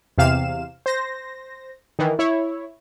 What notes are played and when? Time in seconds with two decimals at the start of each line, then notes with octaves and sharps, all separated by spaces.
0.18 E2 C3 F5 E7
0.86 C5 A#6
1.99 D#3 E3
2.19 E4 C#5